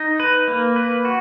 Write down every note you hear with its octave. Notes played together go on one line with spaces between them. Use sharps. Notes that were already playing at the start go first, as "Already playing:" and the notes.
Already playing: D#4
B4
A#3
B4
F#4